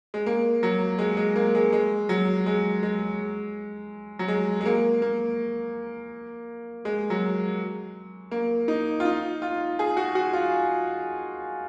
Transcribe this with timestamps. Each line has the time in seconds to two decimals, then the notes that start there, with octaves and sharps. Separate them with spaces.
0.14 G#3
0.26 A#3
0.63 F#3
0.99 G#3
1.17 G#3
1.36 A#3
1.55 G#3
1.73 G#3
2.09 F#3
2.46 G#3
2.83 G#3
4.19 F#3
4.28 G#3
4.61 G#3
4.65 A#3
5.02 A#3
6.85 G#3
7.10 F#3
8.31 A#3
8.68 D#4
9.00 F4
9.05 D#4
9.42 F4
9.79 G#4
9.97 F#4
10.15 F#4
10.33 F4